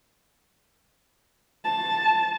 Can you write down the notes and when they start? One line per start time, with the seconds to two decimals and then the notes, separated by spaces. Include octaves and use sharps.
1.64 A5